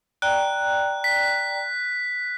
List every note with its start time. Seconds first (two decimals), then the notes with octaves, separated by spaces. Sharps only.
0.22 D5 G5 A#5 F#6
1.04 B6